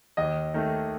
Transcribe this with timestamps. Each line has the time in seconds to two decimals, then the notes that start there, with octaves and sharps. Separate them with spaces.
0.17 D#2 D#5
0.54 D#3 A3